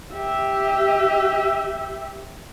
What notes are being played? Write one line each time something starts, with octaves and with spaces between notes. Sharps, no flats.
G4 E5